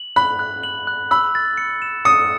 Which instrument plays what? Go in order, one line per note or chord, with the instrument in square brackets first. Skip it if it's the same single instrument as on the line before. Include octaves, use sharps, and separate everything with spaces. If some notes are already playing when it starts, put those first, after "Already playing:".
Already playing: [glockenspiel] F#7
[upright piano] B5 [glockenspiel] F#6
[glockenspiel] F#6
F#7
F#6
[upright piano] B5 [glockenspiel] E6
[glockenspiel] A6
C#7
E7
[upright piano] D#6 [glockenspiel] C#7